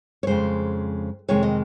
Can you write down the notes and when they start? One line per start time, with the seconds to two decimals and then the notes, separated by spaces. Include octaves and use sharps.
0.23 C#5
0.27 F2 C#3 G#3 C5
1.28 F2 C3 D#3 G#3 C#5
1.43 D#5